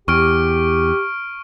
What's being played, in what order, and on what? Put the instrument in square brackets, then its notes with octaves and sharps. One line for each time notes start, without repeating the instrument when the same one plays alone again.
[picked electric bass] E2 [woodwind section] G4 [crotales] C#6 F6 D7